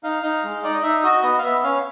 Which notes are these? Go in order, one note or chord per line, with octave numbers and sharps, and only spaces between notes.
D#4 F5
D#4
G#3
D#4 D5
D#5
D#4 E5
F#4 D#5
B3 D#5
F5
B3 E5
C#4 F5